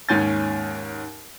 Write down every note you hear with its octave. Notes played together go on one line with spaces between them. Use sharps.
D#2 G#2 C#4 G#5 G6 A6